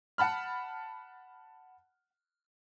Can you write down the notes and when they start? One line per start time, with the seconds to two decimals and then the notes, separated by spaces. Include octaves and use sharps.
0.18 F#5 A5 B5 F6